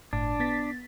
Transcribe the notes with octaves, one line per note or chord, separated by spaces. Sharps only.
G1 A2 D4
B3 A6 B6